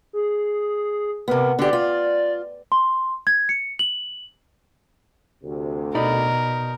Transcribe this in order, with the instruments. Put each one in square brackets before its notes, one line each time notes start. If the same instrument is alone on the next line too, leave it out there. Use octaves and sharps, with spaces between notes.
[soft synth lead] G#4
[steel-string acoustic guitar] C3 B3 [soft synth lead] A#4
[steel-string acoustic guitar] D3 G4 [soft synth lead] D5
[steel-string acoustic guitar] F4
[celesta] C6
G#6
C#7
F#7
[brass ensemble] D2 C3
[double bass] B2 [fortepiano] D#4 D5 B5 [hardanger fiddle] A#4